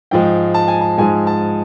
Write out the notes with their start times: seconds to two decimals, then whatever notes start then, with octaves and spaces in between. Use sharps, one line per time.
0.11 G#2 F3 G#3 G5
0.54 A5
0.68 G#5
0.81 A5
0.98 G#2 F3 G#3 G#5
1.27 A5